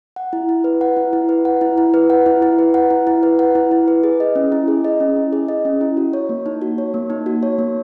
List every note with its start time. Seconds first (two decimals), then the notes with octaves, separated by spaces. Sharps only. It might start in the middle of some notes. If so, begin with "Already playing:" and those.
0.16 F#5
0.33 E4
0.49 E4
0.64 B4
0.81 F#5
0.97 E4
1.13 E4
1.29 B4
1.45 F#5
1.61 E4
1.78 E4
1.94 B4
2.10 F#5
2.26 E4
2.42 E4
2.59 B4
2.74 F#5
2.90 E4
3.07 E4
3.23 B4
3.39 F#5
3.55 E4
3.71 E4
3.88 B4
4.03 G#4
4.20 D#5
4.36 C#4
4.52 E4
4.68 G#4
4.85 D#5
5.00 C#4
5.16 E4
5.33 G#4
5.48 D#5
5.65 C#4
5.81 E4
5.97 F#4
6.13 C#5
6.29 A#3
6.46 D#4
6.61 F#4
6.78 C#5
6.94 A#3
7.10 D#4
7.26 F#4
7.43 C#5
7.59 A#3